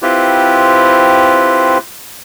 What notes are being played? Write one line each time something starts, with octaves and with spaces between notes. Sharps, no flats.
C4 E4 F4 G4 B4 C5